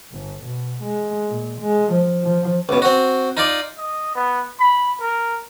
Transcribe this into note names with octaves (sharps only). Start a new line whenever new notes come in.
G1
B2
G#3
A#2
G#3
F3
F3
C#2 B2
C4 F#4
D#4 F4 D5
D#5
B3
B5
A#4